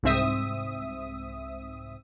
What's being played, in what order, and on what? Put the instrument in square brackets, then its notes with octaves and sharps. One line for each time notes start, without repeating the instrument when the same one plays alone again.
[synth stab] C2 G#2 C4 E5 D#6